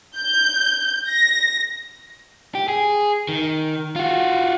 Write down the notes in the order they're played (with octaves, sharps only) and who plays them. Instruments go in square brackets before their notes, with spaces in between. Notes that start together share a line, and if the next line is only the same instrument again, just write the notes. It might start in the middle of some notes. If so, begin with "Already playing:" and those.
[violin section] G6
A#6
[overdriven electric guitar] G4
G#4
D#3
F4 F#4